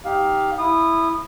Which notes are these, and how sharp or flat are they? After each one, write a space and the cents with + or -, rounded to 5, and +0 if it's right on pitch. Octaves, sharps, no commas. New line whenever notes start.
D#4 +15 G4 +0 F5 +10
E4 +0 D#6 -20